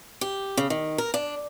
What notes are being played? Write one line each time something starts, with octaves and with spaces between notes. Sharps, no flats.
G4
C#3
D#3
A#4
D4